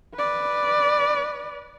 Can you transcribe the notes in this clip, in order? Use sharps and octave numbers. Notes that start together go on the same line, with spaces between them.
B4 D5